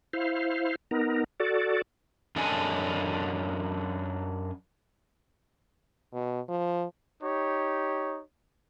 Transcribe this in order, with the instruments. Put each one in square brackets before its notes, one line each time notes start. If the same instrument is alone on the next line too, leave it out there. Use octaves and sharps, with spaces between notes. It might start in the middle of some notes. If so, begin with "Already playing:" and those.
[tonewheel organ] E4 C5 F5
B3 D#4 A#4
F#4 A4 D5
[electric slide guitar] F#2 D4 A4 D#5 G#5
[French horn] B2
F3
[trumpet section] D#4 G4 C#5